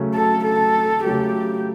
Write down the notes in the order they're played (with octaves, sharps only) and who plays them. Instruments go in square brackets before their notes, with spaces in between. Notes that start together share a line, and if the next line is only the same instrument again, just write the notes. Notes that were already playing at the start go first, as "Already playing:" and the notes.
Already playing: [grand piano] C#3 F#3 A3 C#4
[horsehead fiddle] A4
A4
[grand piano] C#3 F#3 A3 [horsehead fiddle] G4